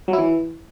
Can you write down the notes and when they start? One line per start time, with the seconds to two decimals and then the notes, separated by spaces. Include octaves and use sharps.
0.08 F#3
0.13 E4
0.18 E3